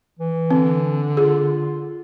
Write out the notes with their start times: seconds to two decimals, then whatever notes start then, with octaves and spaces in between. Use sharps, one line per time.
0.19 E3
0.51 D3 C4
1.17 F4 G#4